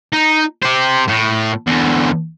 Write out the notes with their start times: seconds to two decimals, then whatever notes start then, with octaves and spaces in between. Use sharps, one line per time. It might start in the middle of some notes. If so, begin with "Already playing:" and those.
0.12 D#4
0.62 G4 C5
1.09 A2
1.67 E2 D3